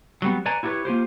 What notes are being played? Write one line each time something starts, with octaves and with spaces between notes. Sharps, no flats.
F#3 G3 B3
B4 C#5 D5 G#5 A#5
E4 F#4 G4 A4 B4 C#5
A#3 F4 G4 C5